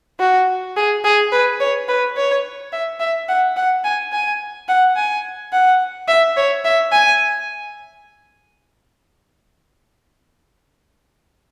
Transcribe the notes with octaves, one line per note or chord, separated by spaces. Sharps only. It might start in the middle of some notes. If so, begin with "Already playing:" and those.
F#4
G#4
G#4
B4
C#5
B4
C#5
E5
E5
F#5
F#5
G#5
G#5
F#5
G#5
F#5
E5
C#5
E5
G#5